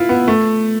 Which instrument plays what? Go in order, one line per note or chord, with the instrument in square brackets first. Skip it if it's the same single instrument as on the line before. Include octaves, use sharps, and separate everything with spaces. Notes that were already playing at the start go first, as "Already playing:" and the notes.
Already playing: [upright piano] E4 F4
B3
A3